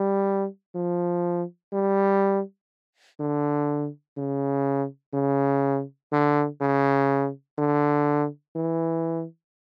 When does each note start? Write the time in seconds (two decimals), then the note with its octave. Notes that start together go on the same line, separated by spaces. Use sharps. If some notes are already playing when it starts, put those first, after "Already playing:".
Already playing: G3
0.75 F3
1.73 G3
3.20 D3
4.17 C#3
5.14 C#3
6.12 D3
6.61 C#3
7.59 D3
8.56 E3